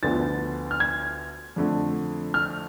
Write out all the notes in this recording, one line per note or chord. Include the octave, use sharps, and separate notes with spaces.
D2 D3 F3 B3 A6
F6
G#6
F2 D3 A3
F6